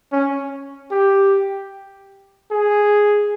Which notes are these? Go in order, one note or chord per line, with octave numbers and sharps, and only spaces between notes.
C#4
G4
G#4